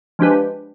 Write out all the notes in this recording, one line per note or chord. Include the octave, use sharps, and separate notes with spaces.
F3 G#3 D4 G4 B4